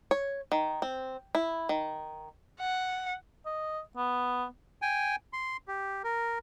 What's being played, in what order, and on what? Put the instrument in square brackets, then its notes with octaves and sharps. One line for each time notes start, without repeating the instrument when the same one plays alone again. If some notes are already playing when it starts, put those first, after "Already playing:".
[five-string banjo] C#5
D#3
C4
E4
D#3
[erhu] F#5
[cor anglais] D#5
B3
[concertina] G5 G#5
C6
G4
A#4